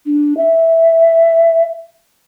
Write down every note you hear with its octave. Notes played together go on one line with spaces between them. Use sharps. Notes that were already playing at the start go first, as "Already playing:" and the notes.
D4
E5